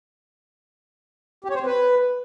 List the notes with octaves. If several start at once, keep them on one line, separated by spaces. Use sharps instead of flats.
G4
C#5
C5
C4
B4